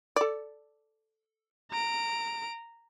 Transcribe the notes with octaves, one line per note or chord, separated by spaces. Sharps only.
A4 D5
A#5 D7